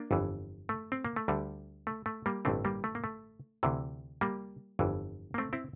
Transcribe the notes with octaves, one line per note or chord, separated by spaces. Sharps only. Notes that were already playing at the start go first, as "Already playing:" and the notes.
Already playing: A#3 D4
G1 F2 E3
A3
C4
A#3
A3
D2 D3 G3
A3
A3
G3 A#3
A1 G2 D3 A3 C4
G3 A#3
A3
A#3
A3
D2 C3 E3
G3 A#3
G1 F2 E3
A#3
A3 C4
C4 E4